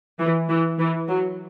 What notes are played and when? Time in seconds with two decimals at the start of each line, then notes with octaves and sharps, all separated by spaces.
0.19 E3
0.49 E3
0.78 E3
1.08 F#3